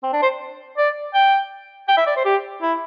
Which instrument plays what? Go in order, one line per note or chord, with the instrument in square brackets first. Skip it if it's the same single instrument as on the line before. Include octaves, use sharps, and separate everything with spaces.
[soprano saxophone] C4
D4
C5
D5
G5
G5
E5
D5
C5
G4
E4